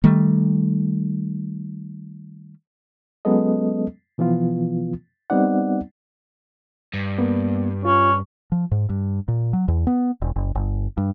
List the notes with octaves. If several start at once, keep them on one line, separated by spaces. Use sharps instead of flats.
D#3 G3 A3
F#3 G#3 B3 C#4 A4 D#5
B2 E3 F3 B3 F4
G3 B3 C4 D#4 D5 F#5
G2
A#3 B3
C#4 F4
F3
G#2
G2
A#2
F#3
E2
B3
E1
F#1
G1
G2